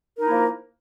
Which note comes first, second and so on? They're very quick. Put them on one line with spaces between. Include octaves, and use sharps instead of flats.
A#4 D#4 E4 A#3 F3